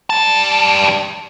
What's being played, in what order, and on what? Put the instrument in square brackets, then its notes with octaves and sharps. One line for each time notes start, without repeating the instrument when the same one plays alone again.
[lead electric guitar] G3 A5